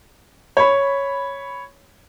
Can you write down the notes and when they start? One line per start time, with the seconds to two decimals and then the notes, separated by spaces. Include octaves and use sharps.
0.57 C#5 B5